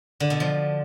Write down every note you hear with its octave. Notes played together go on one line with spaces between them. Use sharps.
D3
B2
F3